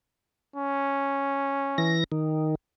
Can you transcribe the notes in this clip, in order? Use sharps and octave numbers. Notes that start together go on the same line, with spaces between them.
C#4
E3 A#6
D#3